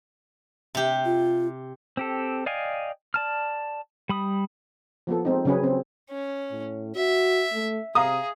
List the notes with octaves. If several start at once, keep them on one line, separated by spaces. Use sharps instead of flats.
C3 G4
F4
C4 G4 A4
D5 D#5 F5 G5 G#5
D5 A5 F6
G3 B5 D#6
F3 A#3 B3 A4
G#3 C4 D#4
C#3 F#3 C#4 G#4 B4
C4
C#4
A2
F#4 E5
A3
C3 G#4 F5 A#5 D#6